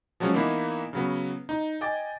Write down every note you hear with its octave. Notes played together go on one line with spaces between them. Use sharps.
F3 F#3 G#3 C#4
E3 A#3 B3 D#4 E4
C#3 F#3 B3
D#4
D#5 G5 G#5 D6 A6